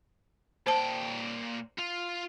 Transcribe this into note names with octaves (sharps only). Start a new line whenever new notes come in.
A#2 C5 G5 A5
F4